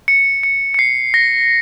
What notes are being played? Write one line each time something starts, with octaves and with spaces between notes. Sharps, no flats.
C#7
C#7
C#7
C7
A#6